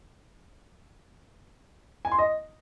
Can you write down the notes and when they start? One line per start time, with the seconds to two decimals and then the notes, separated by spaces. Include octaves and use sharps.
2.05 G#5
2.12 C6
2.19 D#5